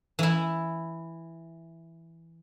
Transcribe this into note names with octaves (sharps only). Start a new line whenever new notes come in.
E3 E4